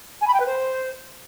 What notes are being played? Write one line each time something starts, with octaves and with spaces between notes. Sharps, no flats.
G#5
B5
G5
B4
C5